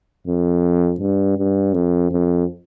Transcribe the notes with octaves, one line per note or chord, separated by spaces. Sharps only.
F2
G2
G2
F2
F2